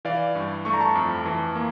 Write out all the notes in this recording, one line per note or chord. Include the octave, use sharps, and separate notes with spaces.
E3 D5 F5
G2
A3 C#6
A#5
A5 C#6
F2
E3
A#3